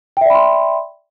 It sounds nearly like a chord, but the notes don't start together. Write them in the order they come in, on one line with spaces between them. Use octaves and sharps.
G5 E5 D5 B5 C6